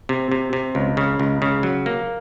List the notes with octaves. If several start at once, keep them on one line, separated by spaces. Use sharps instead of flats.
C3
C3
C3
C#2
C#3
C#2
C#3
F#3
A#3